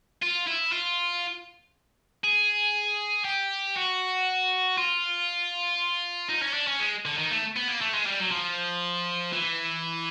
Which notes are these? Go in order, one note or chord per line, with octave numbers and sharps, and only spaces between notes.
F4
E4
F4
G#4
G4
F#4
F4
D#4
C#4
D4
C#4
G#3
D3
D#3
A3
B3
A#3
A3
G#3
G3
F#3
F3
E3